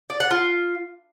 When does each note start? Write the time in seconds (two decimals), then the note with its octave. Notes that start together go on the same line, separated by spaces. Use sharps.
0.10 D5
0.20 F#5
0.31 F4